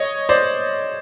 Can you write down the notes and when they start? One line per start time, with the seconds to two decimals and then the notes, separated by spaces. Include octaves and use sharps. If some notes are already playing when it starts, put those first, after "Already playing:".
Already playing: C#5 D#5
0.29 C5 D5